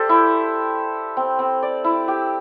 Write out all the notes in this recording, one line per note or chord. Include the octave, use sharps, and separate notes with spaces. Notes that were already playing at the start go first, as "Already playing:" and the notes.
Already playing: G4 A4 C5 D5
E4
C4
C4
D5
E4
G4